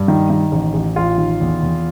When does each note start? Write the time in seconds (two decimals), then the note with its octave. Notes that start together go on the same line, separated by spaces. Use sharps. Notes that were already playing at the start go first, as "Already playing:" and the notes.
Already playing: G2
0.08 D#3
0.30 D#3
0.52 A1
0.74 A1
0.96 A1 F4
1.18 D#3
1.40 E2
1.63 E2